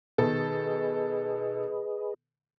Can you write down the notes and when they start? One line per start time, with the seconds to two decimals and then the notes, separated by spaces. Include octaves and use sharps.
0.18 B2 D#3 G#4 A4 B4 D#5